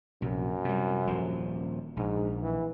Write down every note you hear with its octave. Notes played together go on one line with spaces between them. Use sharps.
A#1 F#2 C3
C3 G3
D#1 F3
A#1 G#2
E3